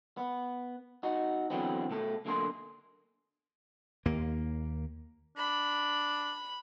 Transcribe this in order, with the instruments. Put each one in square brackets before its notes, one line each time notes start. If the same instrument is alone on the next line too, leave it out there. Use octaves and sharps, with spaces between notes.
[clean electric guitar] B3
D#4 F#4
D3 E3 F#3 B3 C4
B2 A3 A4
B1 D3 A#3 A4 G#5 C6
[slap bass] D#2 A#3
[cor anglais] D4 [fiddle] B5